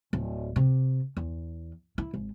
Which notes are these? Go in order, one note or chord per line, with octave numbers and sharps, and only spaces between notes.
D1
C3
E2
E4
G#1